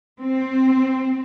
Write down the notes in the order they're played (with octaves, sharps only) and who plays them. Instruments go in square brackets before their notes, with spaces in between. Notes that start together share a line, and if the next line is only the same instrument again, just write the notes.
[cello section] C4